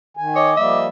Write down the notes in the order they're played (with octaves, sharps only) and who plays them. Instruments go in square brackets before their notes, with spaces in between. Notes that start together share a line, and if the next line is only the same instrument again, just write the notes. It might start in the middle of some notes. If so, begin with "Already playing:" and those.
[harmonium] D#3 G#5
[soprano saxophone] C#5 [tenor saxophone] D#5 [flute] D6
[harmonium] F3 G3 A#3 [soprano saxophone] E5